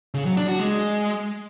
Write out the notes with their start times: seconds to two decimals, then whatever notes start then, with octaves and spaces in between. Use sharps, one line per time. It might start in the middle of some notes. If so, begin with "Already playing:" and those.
0.14 C#3
0.26 F#3
0.37 D4
0.48 F#4
0.60 G#3